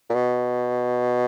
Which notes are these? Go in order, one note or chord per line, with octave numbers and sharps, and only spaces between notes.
A#2
B2